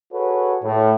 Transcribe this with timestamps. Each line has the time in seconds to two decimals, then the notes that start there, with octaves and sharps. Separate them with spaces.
0.13 F#4 G#4 A4 B4 C#5
0.63 A2